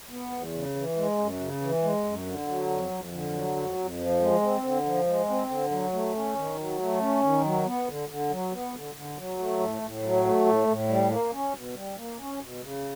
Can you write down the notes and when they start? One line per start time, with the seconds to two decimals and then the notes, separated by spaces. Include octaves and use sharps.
0.10 B3
0.31 E2
0.53 C#3
0.76 E3
0.97 G#3
1.18 F#2
1.40 C#3
1.62 E3
1.84 G#3
2.04 F#2
2.26 D3
2.47 F#3
2.70 F2
2.91 F2
3.12 D3
3.34 F#3
3.56 F2
3.77 F2
3.99 F3
4.20 G#3
4.41 C4
4.64 D3
4.85 F3
5.07 G#3
5.29 C4
5.50 D3
5.71 F#3
5.93 A3
6.15 C#4
6.36 D#3
6.58 F#3
6.79 A3
7.01 C#4
7.23 D#3
7.43 F#3
7.66 B3
7.88 D3
8.09 D3
8.30 F#3
8.52 B3
8.74 D3
8.95 D3
9.17 F#3
9.39 A3
9.59 A2
9.82 A2
10.02 F#3
10.25 A3
10.46 A2
10.67 A2
10.89 G3
11.11 A#3
11.33 C#4
11.54 B2
11.75 G3
11.96 A#3
12.19 C#4
12.41 B2
12.62 C#3